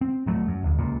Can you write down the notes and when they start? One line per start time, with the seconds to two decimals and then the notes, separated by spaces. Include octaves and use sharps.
0.01 C4
0.26 D1 G2 F#3 A3
0.48 F#2
0.63 D#1 D2
0.79 C#2 A#2